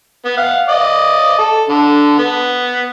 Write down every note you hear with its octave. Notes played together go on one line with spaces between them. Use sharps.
B3
F5 F#5
D5 D#5
A4
D3
B3